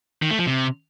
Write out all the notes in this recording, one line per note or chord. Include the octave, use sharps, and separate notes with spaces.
D#3
A3
F3
C3